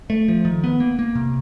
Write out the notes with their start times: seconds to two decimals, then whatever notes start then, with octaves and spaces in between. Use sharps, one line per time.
0.10 A3
0.28 F3
0.45 D#3
0.64 B3
0.80 A#3
0.99 A#3
1.15 C3